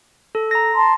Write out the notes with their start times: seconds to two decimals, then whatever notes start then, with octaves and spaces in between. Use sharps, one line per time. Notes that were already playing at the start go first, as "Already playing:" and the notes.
0.35 A4
0.51 A#5 A#6
0.75 A5 C6